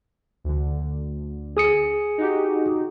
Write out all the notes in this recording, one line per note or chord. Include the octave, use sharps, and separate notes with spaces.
D2 D3
G#4 D#6 C#7
D#4 F#4 G4